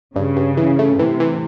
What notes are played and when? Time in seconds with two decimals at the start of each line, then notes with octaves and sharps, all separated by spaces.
0.16 G2 C#3
0.37 G2
0.57 E3
0.79 A3
0.99 C3 E3
1.20 E3